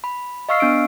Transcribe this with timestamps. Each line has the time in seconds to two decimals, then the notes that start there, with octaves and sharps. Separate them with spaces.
0.04 B5
0.49 D#5 F5 C#6 E6 F6 C7
0.60 B3 D4 E6 D7